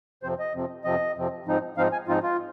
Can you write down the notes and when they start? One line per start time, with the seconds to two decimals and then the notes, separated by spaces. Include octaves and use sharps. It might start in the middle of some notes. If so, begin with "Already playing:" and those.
0.23 F2 C3 F3 C4 C5
0.39 D#5
0.54 F2 C3 F3 C4
0.84 F2 C3 F3 C4 D#5
1.16 F2 C3 F3 C4
1.46 G#2 F3 C4 D#4
1.77 G#2 F3 C4 D#4 F5
1.92 G#5
2.08 G#2 F3 C4 D#4 F4
2.23 F4